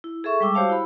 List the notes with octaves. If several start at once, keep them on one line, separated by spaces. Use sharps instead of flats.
E4
G#4 A4 E5 C#6
G3 G#3 G5 D6 E6
F#4 G4 C5 C#5 F5 A5
E4 B5